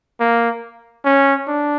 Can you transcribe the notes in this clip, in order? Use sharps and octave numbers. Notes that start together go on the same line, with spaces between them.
A#3
C#4
D4